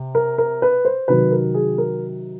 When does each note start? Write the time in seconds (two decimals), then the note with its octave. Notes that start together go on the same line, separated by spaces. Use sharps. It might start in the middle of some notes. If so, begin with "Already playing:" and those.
Already playing: C3
0.15 A#4
0.38 A#4
0.62 B4
0.85 C5
1.08 C3 D#3 F#3 B4
1.32 A#4
1.54 G#4
1.78 A#4